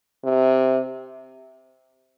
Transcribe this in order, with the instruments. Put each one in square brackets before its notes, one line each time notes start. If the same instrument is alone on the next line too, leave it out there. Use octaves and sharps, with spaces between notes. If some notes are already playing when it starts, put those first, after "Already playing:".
[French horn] C3